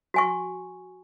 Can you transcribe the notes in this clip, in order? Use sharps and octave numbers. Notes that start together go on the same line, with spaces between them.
F#4 G#5 C#6